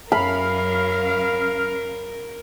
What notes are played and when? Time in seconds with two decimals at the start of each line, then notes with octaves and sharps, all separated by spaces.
0.12 F#2 C#4 A#4 F5 B5 F6